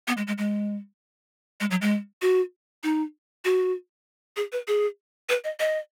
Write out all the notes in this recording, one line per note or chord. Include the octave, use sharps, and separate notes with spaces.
B3
G#3
G#3
G#3
G#3
F#3
G#3
F#4
D#4
F#4
G#4
B4
G#4
B4
D#5
D#5